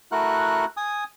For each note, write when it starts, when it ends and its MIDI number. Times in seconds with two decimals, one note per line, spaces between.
0.12 0.65 57
0.12 0.65 64
0.12 0.65 66
0.12 0.65 70
0.12 0.65 78
0.12 0.65 90
0.77 1.04 80
0.77 1.04 87